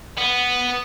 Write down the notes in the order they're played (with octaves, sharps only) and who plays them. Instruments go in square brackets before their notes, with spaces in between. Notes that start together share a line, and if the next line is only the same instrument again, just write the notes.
[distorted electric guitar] B3